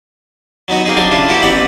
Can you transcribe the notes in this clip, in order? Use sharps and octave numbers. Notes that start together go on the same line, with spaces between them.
F#3 B3 D#4 F#4
A#3 C4 D#4 G#4
F#3 G3 D4 C6
C#3 D4 E4 F4
A#3 B3 E4 F#4 G4
A1 B3 C4 D5 F#5 B5